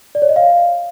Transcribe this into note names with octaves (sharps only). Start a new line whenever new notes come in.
D5
C#5
D#5
F5